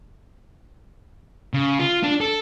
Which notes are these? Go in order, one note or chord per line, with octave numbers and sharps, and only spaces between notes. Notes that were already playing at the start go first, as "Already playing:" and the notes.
C#3
F4
D4
A4